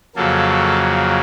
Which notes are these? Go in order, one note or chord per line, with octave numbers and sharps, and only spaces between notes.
F2 C#3 F#3 A#3 A4